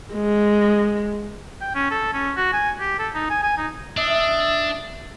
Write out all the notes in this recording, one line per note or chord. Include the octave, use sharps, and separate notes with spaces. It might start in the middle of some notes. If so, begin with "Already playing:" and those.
G#3
G5
C#4
A4
C#4
F#4
G#5
G4
A4
D#4
G#5
G#5
D#4
D4 D#5 E5